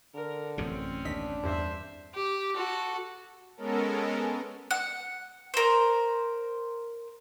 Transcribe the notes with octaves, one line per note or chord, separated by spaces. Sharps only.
D3 A#4
A1 F#2 C3 C4 C#4
D#2 D4 D#5 B6
E2 G2 C5 E5
G4
F#4 A4
G#3 B3 C#4 A4 A#4
F#5
A#4 C5